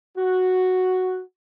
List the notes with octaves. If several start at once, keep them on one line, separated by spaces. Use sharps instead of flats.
F#4